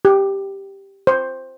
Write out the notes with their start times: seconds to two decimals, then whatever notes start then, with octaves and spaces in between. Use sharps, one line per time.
0.05 G4
1.07 C5